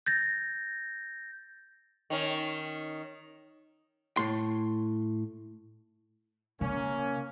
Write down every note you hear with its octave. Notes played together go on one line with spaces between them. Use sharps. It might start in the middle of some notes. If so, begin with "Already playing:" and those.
G6 A6 A#6
D#3 C#4
A2 C6
C#3 A#3 C#4